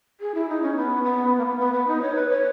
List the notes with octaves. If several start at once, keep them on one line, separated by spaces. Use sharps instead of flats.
G#4
E4
D#4
C#4
B3
B3
A#3
B3
B3
B3
D#4
C#5
B4
C#5